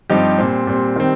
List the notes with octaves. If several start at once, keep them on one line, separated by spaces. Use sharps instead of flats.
G2 F3 C4 D#4 G4
A#2 G3 C4
A#2 G3 C4
D#3 G3 C4